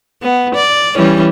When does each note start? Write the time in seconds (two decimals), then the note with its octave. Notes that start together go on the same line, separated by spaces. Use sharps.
0.22 B3
0.55 D5
0.96 E3 G3 C#4